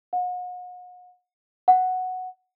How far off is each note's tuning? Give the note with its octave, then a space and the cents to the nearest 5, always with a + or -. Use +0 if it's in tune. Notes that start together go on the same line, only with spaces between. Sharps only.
F#5 -40
F#5 +0